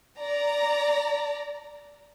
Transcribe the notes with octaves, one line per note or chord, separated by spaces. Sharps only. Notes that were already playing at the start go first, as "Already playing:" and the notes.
D5 A#5